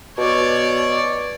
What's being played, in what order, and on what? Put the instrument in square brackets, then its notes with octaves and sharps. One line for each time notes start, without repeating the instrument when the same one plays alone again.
[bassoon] B2 [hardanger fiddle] C#5 D5